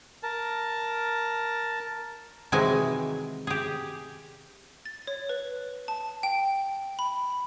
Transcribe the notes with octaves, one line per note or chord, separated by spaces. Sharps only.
A#4 A5
C3 D#3 E3 F#3 G#3 G#5
G4 G#4
A6
C#5
B4
A5
G5
B5